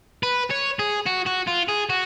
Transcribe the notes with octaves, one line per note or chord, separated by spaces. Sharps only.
B4
C#5
G#4
F#4
F#4
F4
G#4
F#4